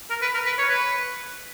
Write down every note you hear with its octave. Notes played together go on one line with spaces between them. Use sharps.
A#4
B4
A#4
B4
C#5
B4